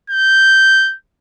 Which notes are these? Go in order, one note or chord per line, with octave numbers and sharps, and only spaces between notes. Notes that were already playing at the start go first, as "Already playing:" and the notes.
G6